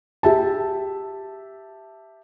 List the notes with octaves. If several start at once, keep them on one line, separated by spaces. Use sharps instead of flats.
G4 E5 A5